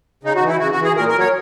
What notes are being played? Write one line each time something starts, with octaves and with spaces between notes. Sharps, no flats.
C#3 D#4
F#4
E3
E4
C#3 F#4
F#4
E3
G#4
A#2 A#4
A#4
F#3
C#5